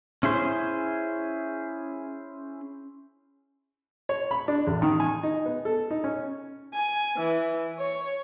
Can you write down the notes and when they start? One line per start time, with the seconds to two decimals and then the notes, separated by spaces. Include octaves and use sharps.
0.23 C#4 E4 G#4 C5
4.09 C#5
4.31 B5
4.48 D4
4.67 A1
4.82 D#3
5.00 G#5
5.23 D#4
5.46 B3
5.65 A4
5.90 D#4
6.04 C#4
6.74 G#5
7.17 E3
7.79 C#5